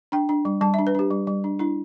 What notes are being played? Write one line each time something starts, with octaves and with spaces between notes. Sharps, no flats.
D4 G5
D4
G3
G3 A5
E5
D4
B4
D4 G4
G3
G3
D4
D4 E4